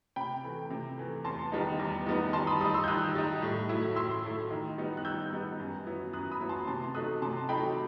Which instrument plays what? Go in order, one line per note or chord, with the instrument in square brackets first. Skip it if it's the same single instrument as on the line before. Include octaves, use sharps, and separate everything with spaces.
[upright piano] C3 G5 B5
E3 A3
C3
E3 A3
E2 A5 C6
D#3 G3 B3 D#4
E2
D#3 G3 B3 D#4
D#3 A5 C6
B5 D#6
G3 D#4 B5 D#6
C6 E6
G6
D#3 D#6 F#6
G3 D#4
A2
F#3 A3 E4
A2 C6 E6
F#3 A3 E4
D#3
G3 B3 D#4
F#6
D#3 E6 G6
G3 B3 D#4
F#2
F#3 B3 E4
F#2 D#6 F#6
B5 D#6
F#3 B3 E4
A5 C6
C3 A5 C6
F#3 A3 D#4 D#6 F#6
C3 A5 C6
F#3 A3 D#4 G5 B5